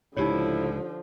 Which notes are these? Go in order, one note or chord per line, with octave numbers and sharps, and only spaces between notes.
C#2 A2 D3 F3 D#4 E4 G4 C#5